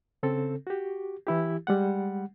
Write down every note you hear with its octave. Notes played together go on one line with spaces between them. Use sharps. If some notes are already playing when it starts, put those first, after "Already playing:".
C#3 C4 A4
F#4 G4
E3 E4 G4
G3 G#3 F#5